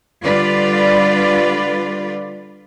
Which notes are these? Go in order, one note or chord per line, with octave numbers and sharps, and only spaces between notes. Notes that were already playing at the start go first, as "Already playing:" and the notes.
D3 G3 F4 B4 D5